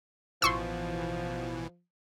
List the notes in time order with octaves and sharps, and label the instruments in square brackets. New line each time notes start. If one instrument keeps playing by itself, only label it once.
[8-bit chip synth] A1 B2 E3 [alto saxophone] F3 [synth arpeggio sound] C6 C#6 E6